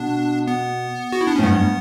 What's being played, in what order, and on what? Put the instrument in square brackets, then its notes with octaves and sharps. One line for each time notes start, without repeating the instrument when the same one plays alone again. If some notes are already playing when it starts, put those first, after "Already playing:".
Already playing: [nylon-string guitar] B2 [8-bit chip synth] D4
[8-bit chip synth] B3
F#4
E4
D4
C#4
[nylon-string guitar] A2
[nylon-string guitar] G2 [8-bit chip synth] B3